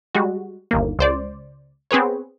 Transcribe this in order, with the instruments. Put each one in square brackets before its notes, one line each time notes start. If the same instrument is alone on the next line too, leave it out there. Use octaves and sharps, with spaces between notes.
[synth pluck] G3 G#3 F#4
G1 D#2 A#3
C#2 C5 D5
B3 C4 G#4 B4 C#5